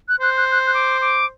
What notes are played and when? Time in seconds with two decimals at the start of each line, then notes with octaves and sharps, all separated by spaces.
0.08 F#6
0.20 C5 F#6
0.37 F#6
0.51 F#6
0.67 F#6
0.74 D6
1.01 D6